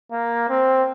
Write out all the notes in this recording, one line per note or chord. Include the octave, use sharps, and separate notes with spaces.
A#3
C4